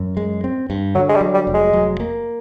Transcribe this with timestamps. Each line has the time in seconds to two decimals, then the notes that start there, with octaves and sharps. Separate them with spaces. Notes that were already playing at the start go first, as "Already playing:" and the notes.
Already playing: F#2
0.17 G#3
0.44 C4
0.70 G2
0.95 D3 F#3
1.09 G#3
1.15 G3
1.21 F#3
1.34 G3
1.47 F1
1.54 G#3
1.73 F#3
2.00 A#3